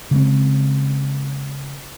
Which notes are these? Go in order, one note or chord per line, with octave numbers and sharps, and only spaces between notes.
C#3 G#3 C4